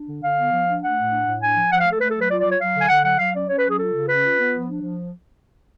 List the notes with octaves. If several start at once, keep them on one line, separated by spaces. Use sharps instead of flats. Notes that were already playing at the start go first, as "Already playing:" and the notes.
Already playing: D4
D3
D3 F5
B3
F3
D4
A3 F#5
A2
D4
A2
D4 G#5
F3
F3 F#5
F5
A3
A4
A3 B4
A4
F#3
B4
F4 D5
D5
F#3 C#5
F#3 F5
D3
G#5
D3 F#5
F#3 F#5
F#3 F5
C#4 D5
C#4 C#5
B4
F#3
G#4
F4 A4
C#3
C#4 B4
F4
B3
F3
D4
F3